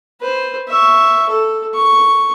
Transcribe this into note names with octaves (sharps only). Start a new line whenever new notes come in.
B4 C5
E5 C#6
A4
C#6